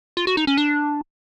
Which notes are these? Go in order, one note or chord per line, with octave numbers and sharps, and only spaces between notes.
F4
F#4
D#4
C#4
D4